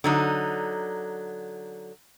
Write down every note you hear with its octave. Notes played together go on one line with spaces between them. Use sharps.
D3 F#3 D#4